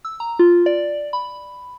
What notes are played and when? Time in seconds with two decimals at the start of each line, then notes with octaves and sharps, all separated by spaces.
0.05 E6
0.20 A#5
0.39 F4
0.66 D5
1.13 B5